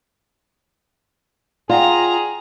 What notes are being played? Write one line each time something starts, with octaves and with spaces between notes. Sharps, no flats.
F4 G#4 D5 F#5 G5 A#5